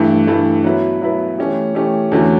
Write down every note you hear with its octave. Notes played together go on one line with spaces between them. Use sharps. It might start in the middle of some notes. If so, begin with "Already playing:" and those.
Already playing: G2 E3 A3
G2 E3 A3
F#3 B3 E4 B4
F#3 B3 E4 B4
E3 A3 C#4 G4
E3 A3 C#4 G4
E2 D3 A3 C#4 F#4